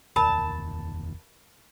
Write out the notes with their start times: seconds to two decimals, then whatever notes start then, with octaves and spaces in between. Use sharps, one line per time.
0.16 F1 D#2 A#4 A5 B5